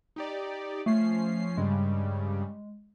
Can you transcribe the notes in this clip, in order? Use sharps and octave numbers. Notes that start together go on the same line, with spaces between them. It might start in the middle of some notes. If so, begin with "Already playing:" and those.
D#4 G4 D5
F3 A3 C#4 C7
G2 C#3 G3 G#3